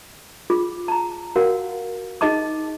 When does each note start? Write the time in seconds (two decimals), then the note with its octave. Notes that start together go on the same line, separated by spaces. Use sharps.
0.50 F4 G#4 D6
0.88 A5 A#5
1.36 F#4 A#4 F5 F#5
2.21 D#4 G#4 D#5 A5 D6